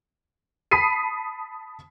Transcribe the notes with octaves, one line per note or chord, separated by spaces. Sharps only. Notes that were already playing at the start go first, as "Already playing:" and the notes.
A5 B5 D#6 B6 C7 D#7